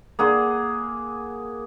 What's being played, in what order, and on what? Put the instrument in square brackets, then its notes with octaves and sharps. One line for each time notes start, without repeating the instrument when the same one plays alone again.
[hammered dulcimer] A#3 G#4 F#5 C6